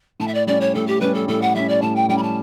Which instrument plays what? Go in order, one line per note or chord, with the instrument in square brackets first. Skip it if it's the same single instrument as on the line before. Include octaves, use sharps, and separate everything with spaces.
[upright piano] A2 [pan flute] A5
[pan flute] E5
D5
[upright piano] G3 C#4 [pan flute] D5
[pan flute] C#5
[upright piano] A2 [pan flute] A4
[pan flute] G4
[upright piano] G3 C#4 [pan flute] B4
[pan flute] A4
[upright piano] A2 [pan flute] A4
[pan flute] F#5
[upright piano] G3 C#4 [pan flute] E5
[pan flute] D5
[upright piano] A2 [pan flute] A5
[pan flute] G5
[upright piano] G3 C#4 [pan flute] G5
[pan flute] B5
A5